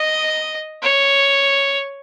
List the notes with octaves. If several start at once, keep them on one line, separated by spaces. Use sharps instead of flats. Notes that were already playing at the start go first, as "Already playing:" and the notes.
Already playing: D#5
C#5